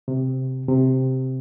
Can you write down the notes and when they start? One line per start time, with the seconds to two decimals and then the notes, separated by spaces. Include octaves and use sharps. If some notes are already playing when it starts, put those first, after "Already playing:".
0.08 C3
0.68 C3